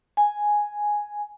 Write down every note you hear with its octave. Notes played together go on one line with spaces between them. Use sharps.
G#5